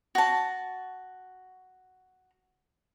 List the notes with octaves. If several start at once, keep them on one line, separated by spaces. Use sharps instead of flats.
F#4 A5